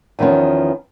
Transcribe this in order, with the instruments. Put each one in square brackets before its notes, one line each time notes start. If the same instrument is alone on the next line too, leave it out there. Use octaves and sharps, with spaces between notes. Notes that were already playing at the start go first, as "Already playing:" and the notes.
[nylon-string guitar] E2 D#3 F3 B3 C#4